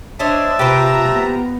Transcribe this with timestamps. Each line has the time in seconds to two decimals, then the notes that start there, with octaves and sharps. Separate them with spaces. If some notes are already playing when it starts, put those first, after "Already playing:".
0.19 D4 C5 C#5 D#5 E5 A5
0.59 C3 F4 G4 B4 C5 A#5
1.10 B3